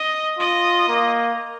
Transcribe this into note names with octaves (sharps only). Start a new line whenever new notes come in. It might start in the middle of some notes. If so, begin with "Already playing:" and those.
Already playing: D#5
F4 D#5
A#3